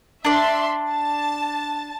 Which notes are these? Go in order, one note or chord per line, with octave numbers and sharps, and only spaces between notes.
D4 D5 E5 C6
A5 A6